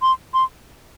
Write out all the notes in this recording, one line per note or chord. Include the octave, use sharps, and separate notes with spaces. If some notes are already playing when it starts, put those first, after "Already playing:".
C6
C6